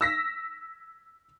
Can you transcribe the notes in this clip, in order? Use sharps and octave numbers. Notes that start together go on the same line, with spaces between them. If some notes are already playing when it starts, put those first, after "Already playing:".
E6 A#6 B6